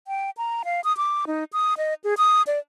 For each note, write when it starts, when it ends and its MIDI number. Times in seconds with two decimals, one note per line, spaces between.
0.08 0.30 79
0.37 0.63 82
0.65 0.81 77
0.84 0.95 87
0.97 1.25 86
1.27 1.44 63
1.53 1.74 87
1.78 1.94 75
2.04 2.14 68
2.18 2.42 87
2.47 2.59 74